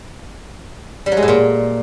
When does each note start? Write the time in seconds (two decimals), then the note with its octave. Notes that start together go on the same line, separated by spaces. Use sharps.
1.06 G3
1.12 F#3
1.17 G#3
1.22 A2
1.28 A#2